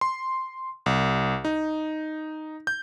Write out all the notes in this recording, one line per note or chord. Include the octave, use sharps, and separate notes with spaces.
C6
C2
D#4
G6